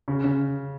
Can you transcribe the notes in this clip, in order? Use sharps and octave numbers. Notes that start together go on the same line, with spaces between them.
C#3
C#3